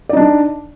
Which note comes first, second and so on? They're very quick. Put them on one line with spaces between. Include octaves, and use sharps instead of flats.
D5 D#4 D4